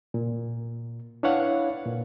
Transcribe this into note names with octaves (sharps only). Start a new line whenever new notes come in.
A#2
D4 E4 B4 C#5 F5 F#5
A#2